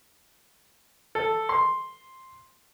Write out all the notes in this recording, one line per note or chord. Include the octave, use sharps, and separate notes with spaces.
A4
C6